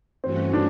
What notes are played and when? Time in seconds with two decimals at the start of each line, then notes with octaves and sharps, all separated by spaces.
0.23 G2 E3 A3 C4 C#4 F#4
0.53 D4